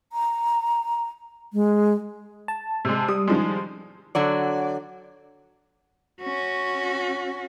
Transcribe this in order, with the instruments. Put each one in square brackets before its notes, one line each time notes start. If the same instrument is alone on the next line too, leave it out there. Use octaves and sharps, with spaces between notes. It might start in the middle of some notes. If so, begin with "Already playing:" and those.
[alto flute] A#5
G#3
[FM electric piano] A5
[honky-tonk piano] C3 G#3
[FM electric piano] G3 [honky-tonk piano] D#6
[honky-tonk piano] D#3 F3 G#3
[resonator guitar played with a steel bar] D3 F#3 D5
[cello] C#4 F#4